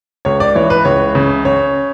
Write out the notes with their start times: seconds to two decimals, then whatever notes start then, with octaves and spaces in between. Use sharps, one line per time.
0.25 C#2 C#5
0.40 D5
0.55 E3 C#5
0.70 B4
0.85 C#2 C#5
1.15 C#3
1.45 C#3 C#5